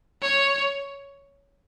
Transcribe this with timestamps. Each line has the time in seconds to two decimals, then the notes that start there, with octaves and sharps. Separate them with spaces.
0.22 C#5